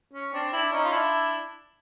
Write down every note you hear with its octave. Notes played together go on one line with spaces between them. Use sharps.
C#4
C4 D4
D4 E4
C#4 D#4
F4
D4 E4